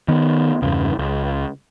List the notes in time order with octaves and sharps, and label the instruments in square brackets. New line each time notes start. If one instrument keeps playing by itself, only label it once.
[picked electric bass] D#3 B3
E2 G2 C#3
C#2